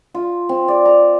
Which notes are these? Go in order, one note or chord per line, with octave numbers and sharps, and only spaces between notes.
F4
C4
D5
A#5